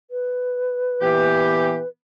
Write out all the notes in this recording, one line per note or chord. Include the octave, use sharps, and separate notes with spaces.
B4
A#2 E3 B3 G4